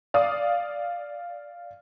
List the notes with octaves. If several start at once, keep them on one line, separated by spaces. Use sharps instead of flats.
D5 F5 D#6